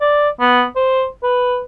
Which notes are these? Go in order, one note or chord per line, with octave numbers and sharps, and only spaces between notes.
D5
B3
C5
B4